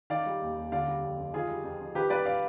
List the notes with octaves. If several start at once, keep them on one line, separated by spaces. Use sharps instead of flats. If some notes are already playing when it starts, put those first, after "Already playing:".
D#3 D5 F5
G3
D#2
D#2
D3 D5 F5
G3
F2
F2
D#3 F4 G#4
G3
F2
F2
D#3 G4 B4
G3 B4 D5
D5 F5